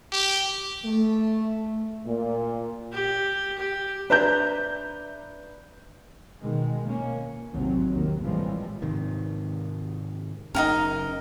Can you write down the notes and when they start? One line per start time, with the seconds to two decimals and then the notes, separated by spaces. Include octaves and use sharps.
0.12 G4
0.85 A3
2.06 A#2
2.93 G4
3.58 G4
4.10 D4 B4 E5 A#5 G6
6.41 B2 D#3 G#3
6.85 A#2 A#3 C#4
7.19 B2
7.53 A1 D#2 C3 F#3 C4
7.89 D#2 C3 D#3
8.21 A2 E3 F3 G3 G#3
8.82 G#2 C3 D#3
10.54 F#1 C#3 C#4 D#4 F#4 A#4